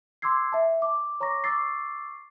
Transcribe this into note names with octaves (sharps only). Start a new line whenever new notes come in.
C6 D6 E6 G#6 C7
E5 A5
D6
C#5 A#5 C#6 D6 A#6
C#6 D6 E6 A6 C7